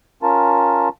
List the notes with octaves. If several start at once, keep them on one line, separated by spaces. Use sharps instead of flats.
C#4 F4 A#4 A5